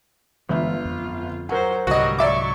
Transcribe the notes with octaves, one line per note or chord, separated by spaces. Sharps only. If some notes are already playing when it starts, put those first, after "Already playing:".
G1 E3 G#3 D4 F4 E5
F2
F#3 A#4 C5 F#5
C2 G#2 D3 F#3 G3 F#4 D#5
F#3 D5 E5 C#6 D6